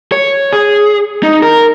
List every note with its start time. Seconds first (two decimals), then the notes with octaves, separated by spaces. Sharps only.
0.12 C#5
0.53 G#4
1.23 D#4
1.42 A#4